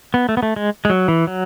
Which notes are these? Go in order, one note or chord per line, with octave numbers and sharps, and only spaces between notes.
B3
A3
B3
A3
G#3
G#3
F#3
E3
F#3